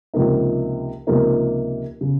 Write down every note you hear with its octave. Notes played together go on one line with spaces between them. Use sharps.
C#2 C3 F3 A#3 D#4
C#2 C3 F3 A#3 D#4
C#3